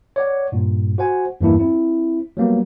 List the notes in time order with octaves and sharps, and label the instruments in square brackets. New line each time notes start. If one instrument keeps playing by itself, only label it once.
[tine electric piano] C#5 D5 F#5
G2 A#2
F#4 C5 F#5 G#5
E2 G2 E3 A#3 D4 E4
C4 E4
F#3 G3 A#3 B3